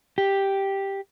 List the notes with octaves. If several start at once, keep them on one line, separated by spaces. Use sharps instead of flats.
G4